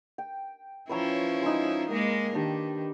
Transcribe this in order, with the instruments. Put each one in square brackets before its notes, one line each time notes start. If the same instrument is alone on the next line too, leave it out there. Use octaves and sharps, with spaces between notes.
[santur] G5
[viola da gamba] F3 C#4 E4 [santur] B4 C#5 A#5
[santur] G#3 D#4
[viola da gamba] G#3 A#3 A#4 [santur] D6
[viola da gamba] D#3 [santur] D4 G4